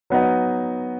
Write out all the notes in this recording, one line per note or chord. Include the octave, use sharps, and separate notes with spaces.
F#3 B3 D#4